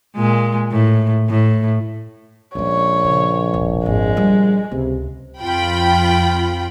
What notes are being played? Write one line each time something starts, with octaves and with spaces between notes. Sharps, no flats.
A#2 G#3
A2
A2
A#1 G#3 C#4 C#5
C#3
E1 C2
G#1 F2 G#3
G3
C#2 C3
F2 F4 G5 B5